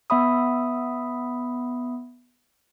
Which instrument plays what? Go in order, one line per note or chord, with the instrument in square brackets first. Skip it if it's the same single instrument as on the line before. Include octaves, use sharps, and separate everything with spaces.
[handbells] B3 E5 B5 D#6